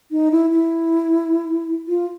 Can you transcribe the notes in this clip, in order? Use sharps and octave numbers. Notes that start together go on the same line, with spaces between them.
D#4
E4
E4
F4